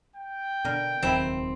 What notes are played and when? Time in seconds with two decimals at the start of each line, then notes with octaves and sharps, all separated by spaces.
0.16 G5
0.65 B2 D3 A#4
1.03 D#1 C#2 D#3 F#3 C4 E4